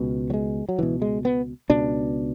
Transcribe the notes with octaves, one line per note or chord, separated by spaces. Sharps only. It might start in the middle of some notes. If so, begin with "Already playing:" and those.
Already playing: C#2 B2
F#3
G#3
F#3
C#2 B2 E3
G#3
B3
C#2 B2 D4